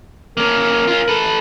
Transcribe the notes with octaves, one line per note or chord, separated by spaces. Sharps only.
A#3 C#4 A#4
C#4 F4
A4 B4